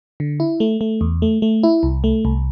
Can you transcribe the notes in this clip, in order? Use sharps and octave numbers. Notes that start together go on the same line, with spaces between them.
D3
E4
A3
A3
E2
A3
A3
E4
C2
A3
C2